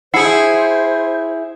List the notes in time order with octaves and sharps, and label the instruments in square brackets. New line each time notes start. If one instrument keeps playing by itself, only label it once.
[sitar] E4 G#4 [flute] C5 [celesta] F#5 C7 C#7